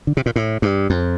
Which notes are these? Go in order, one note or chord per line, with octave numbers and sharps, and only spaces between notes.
D3
C3
A#2
A2
G2
F2